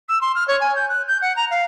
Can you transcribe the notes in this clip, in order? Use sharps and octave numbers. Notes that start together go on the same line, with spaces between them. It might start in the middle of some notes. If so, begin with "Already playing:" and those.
E6
C6
F6
C#5
G#5
G6
F#6
G6
F#5
A#5
F5